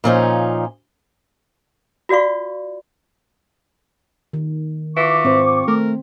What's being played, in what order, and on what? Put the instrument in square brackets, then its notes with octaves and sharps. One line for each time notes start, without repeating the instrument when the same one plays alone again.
[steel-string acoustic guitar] A#2 F3 C#4 D#4
[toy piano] F4 F#4 D5 F5 C#6
[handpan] D#3
[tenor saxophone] E3 [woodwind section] F4 C#6 D6
[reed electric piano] G#2 C5 [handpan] C4
[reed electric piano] A3 [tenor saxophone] A#4